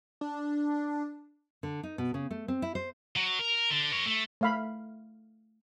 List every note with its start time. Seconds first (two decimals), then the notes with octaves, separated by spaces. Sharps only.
0.21 D4
1.63 D3
1.83 D#4
1.98 B2
2.14 C#3
2.31 A3
2.48 C4
2.62 E4
2.75 C5
3.17 F#3
3.39 A#4
3.70 D3
3.91 A#4 C#5
4.06 A3
4.41 A3 F5 B5